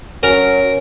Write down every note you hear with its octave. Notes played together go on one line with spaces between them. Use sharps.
F#3 C#4 A#4 C#5